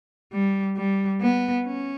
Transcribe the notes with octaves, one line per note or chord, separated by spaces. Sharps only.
G3
G3
B3
C#4